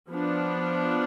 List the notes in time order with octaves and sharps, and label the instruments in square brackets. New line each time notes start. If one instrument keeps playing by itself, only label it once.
[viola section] F3 B3 D4